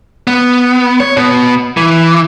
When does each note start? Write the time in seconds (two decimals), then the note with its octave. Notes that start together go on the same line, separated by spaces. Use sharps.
0.27 B3
1.00 C#5
1.17 B2 B3
1.77 E3